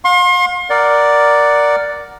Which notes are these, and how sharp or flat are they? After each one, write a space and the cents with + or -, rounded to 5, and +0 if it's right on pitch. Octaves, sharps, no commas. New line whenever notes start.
F5 +40 C6 +35
A#4 +0 D5 +0 F#5 +0